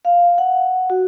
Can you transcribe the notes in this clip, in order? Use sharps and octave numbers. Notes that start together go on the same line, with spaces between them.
F5
F#5
F#4